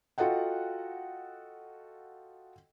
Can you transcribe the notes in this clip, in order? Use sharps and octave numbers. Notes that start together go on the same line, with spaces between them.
F4 F#4 A4 D#5 F#5 G5